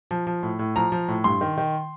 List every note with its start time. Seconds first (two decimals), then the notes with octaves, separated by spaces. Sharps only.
0.11 F3
0.27 F3
0.43 A2
0.59 A2
0.76 F3 A#5
0.92 F3
1.08 A2
1.24 G2 C6
1.41 D#3
1.57 D#3